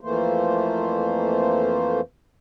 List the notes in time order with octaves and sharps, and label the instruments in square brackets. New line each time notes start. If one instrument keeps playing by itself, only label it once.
[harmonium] F2 E3 A3 A#3 C5